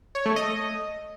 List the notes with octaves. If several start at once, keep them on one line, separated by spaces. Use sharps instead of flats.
C#5
A3
D#5